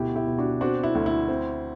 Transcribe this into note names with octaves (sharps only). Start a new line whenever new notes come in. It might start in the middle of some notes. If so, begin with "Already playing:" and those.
Already playing: D2 B2 E4 G4
E4 G4
B2
D4 F#4
C4 D4 F#4
E4
D2
E4
C4